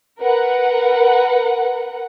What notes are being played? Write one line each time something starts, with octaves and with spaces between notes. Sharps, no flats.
A#4 B4 F#5